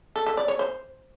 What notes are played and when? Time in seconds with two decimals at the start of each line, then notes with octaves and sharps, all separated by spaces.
0.16 A4
0.26 A4
0.37 D5
0.48 C#5
0.59 C5